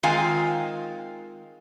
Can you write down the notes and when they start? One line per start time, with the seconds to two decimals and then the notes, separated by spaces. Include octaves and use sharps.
0.03 D#3 G#3 C4 F4 F5 G#5